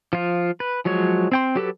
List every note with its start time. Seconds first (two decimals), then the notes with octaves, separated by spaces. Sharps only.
0.13 F3 F4
0.60 B4
0.85 F3 F#3 G#3 C#5
1.32 C4 G5 C6
1.55 F#3 G4 A4 B4